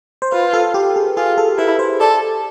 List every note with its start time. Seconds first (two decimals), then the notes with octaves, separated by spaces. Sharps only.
0.22 C5
0.32 F4 B4
0.53 A4
0.74 G4
0.96 G#4
1.17 F4 G#4
1.38 A4
1.58 E4 B4
1.79 C5
2.00 A4 D5